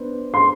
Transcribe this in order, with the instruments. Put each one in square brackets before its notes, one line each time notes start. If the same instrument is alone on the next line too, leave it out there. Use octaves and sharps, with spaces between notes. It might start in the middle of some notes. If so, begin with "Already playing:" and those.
Already playing: [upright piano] B3 D4 C5
[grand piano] C6